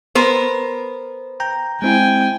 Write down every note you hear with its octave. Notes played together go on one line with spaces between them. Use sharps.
B3 A#4 C5
G5 A#5 G6
G#3 C4 E4 G5 G#5